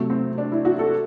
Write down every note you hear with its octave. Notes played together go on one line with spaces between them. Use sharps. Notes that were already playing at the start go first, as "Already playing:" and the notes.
Already playing: C3 F#3 A3
C4
D4
E4
F#4
A4